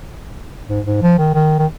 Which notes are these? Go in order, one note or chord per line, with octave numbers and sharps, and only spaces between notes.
G#2
G#2
F3
D#3
D#3
D#3